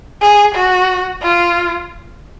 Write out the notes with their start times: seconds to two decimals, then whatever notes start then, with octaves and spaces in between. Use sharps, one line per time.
0.21 G#4
0.55 F#4
1.22 F4